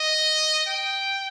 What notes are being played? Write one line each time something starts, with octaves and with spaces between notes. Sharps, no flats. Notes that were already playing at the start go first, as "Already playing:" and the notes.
Already playing: D#5
G5